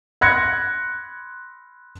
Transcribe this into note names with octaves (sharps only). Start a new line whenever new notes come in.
B5 C6 F#6 G#6 A#6 C#7